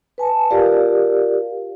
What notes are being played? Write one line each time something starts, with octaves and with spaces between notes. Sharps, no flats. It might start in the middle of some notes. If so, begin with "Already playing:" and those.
B4 G#5 A5
F4 G4 A#4 D5 F5